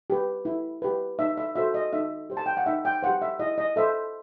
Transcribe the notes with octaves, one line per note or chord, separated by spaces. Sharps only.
G4 B4
E4
G4 B4
D#4 E5
E5
F#4 A4 C5 E5
D#5
D#4 E5
G4 C5
A5
G5
F#5
D#4 E5
G5
G4 C5 F#5
E5
E4 D#5
D#5
A4 C5 E5